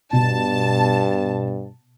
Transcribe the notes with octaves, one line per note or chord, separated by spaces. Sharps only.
G2 B2 A5